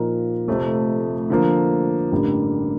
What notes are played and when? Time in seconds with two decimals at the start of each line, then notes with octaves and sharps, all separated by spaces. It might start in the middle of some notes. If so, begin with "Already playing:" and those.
Already playing: A#2 F3 A#3 D#4 A#4
0.48 F1 F2 C3 F3 A3
1.30 D3 F3 A#3
2.12 A1 G2 D3 G3 A#3